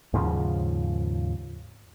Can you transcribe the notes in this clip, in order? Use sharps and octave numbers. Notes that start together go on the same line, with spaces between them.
D#2 G#2 C#3 F3